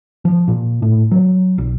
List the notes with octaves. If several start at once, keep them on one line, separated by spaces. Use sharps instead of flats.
F3
A#2
A2
F#3
B1